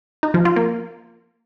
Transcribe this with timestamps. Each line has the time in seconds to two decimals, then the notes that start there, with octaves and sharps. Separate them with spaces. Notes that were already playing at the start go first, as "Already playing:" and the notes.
0.23 D#4
0.34 F3
0.45 F4
0.56 A#3